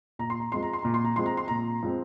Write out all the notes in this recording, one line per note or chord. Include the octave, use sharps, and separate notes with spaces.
A#2 A#5
C6
A#5
F3 G#3 C4 C6
A#5
C6
A#2 A#5
C6
A#5
F3 G#3 C4 C6
A#5
C6
A#2 A#5
F3 G#3 C4